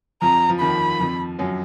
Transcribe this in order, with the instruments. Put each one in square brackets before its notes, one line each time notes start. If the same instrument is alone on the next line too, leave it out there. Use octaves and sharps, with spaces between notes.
[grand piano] F2 F3 [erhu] A#5
[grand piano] F3
[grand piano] D#2 D#3 [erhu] B5
[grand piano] F2 F3
F#2 F#3